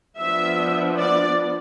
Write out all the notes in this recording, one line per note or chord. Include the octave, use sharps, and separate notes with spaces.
F3 B3 D4 E5
D5